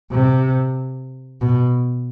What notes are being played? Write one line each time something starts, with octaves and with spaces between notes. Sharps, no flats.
C3
B2